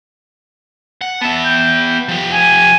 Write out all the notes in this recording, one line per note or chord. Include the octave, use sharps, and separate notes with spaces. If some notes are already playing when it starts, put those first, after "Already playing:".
F#5
B3 E5 A5
G5
F3 G4
G#5